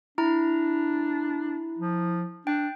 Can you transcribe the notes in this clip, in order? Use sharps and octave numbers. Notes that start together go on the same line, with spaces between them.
D4 E4 A#5
F3
D4 G5